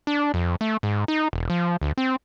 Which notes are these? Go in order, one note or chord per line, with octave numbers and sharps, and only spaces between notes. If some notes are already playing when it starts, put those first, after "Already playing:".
D4
F2
A3
G#2
D#4
E1
F3
D2
C4